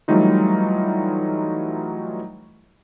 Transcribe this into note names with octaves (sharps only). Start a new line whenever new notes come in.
E3 F#3 G3 A3 D#4 F4